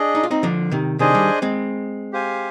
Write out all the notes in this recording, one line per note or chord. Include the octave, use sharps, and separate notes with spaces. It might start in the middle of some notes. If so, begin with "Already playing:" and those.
Already playing: D4 G#4 D#5
D#4
F4
C4 D#4
D3 F3
C3 D#3
C3 D#3 D4 G#4 C5 D#5 G#5
D#3 G3
G#3 C4
G4 C5 F5 G#5